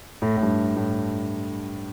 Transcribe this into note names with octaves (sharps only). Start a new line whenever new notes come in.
A2
A2
G2
A2